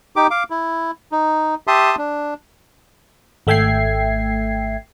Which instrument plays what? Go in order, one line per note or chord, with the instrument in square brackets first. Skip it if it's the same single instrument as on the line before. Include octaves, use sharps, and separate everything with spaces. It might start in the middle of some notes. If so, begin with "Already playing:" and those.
[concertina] D#4 G4 D6
F5 D6
E4
D#4
G4 E5 A5 C6 D#6
D4
[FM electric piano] G#1 A3 E5 G5 G#6 C7